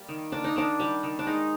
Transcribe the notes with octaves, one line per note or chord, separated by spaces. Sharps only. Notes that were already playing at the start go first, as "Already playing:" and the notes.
Already playing: G3 A#3
D#3
A#3 D4
D#4
D#3 D4
G3
D#3
D4
G#3 D#4